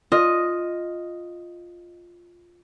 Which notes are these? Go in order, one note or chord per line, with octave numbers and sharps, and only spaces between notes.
F4 D#5